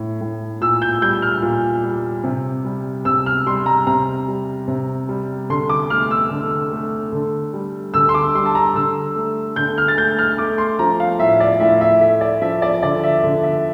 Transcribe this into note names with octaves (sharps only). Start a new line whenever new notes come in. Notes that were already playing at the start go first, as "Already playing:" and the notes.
Already playing: A2
A2
A#2 E6
G6
G3 G6
F6
A#2
G3
C3
G3
C3 E6
F6
G3 C6
A#5
C3 A#5
G3
C3
G3
D3 C6
D6
A3 F6
E6
D3
A3
D3
G3
D3 E6
C6
D6
G3 C6
A5
A#5
D3 E6
A3
D3 G6
F6
A6
A3 G6
F6
A3 D6
C6
F3 A#5
F5
A2 E5
D5
A2 E5
E5
A3 E5
D5
F3 E5
D5
D3 D5
E5
D3
E5